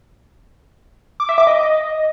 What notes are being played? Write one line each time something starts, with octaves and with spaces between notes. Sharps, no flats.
D6
E5
D6
D#5